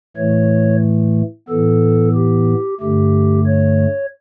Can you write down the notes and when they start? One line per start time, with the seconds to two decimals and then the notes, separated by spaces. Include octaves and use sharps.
0.16 A2 E3 A3 C#5
1.49 A2 E3 B3 A4
2.15 G4
2.80 G2 D3 A3 G4
3.46 C#5